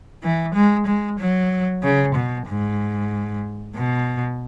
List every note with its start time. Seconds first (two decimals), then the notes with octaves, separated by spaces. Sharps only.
0.23 E3
0.54 G#3
0.86 G#3
1.19 F#3
1.83 C#3
2.15 B2
2.47 G#2
3.75 B2